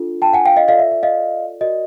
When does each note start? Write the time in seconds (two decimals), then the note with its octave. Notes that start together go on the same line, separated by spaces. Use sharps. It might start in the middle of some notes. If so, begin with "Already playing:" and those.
Already playing: D4 F4 A4
0.22 G5 A5
0.33 F#5 G#5
0.46 F5 G5
0.57 D#5 F5
0.68 F4 A4 D5 D#5 F5
0.79 E5
0.92 E5
1.03 D#5 F5
1.61 F#4 A#4 D5 D#5